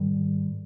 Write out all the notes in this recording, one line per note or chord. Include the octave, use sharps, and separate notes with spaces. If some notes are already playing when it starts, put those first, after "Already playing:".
Already playing: G#2 D#3 G3